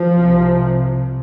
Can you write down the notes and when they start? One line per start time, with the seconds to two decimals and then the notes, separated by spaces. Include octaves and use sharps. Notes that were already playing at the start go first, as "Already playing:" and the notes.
Already playing: F3
0.14 C2 C3